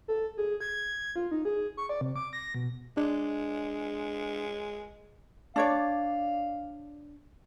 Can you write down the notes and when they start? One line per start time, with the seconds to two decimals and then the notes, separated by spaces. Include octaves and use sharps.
0.08 A4
0.37 G#4
0.61 G#6
1.16 F4
1.31 D#4
1.45 G#4
1.77 C#6
1.89 D5
2.01 C3
2.16 D6
2.33 A#6
2.55 B2
2.97 G#3 D4
5.56 D4 C#5 D5 F5